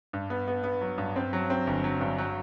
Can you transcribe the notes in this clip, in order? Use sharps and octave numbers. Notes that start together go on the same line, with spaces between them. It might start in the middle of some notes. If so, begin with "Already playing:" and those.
G2
B3
B3
B3
F#3
G2
C4
F#3
C4
G1
F#3
G2
F#3